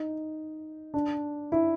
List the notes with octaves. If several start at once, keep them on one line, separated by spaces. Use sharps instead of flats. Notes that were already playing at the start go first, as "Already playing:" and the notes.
Already playing: D#4
D4
E4